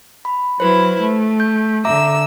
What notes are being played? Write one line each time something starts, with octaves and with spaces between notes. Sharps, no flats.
B5
F#3 E4 B4 C5
A3
G6
D3 E5 A#5 D6 E6